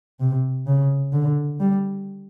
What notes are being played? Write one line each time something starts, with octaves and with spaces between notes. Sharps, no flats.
C3
C#3
D3
G3